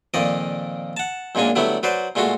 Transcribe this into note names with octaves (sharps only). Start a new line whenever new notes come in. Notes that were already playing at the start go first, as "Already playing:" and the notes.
F2 A#2 D#3 D5 D#5
F#5 A5
F#2 A#2 G#3 A#3 D4 G#5
D3 F#3 G3 A3 B3 E4
F#3 B4 C5 D5
A#2 G#3 A3 F4 F#4